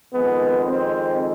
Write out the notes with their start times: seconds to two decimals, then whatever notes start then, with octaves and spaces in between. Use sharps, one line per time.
0.12 F2 D#3 G#3 B3
0.65 C4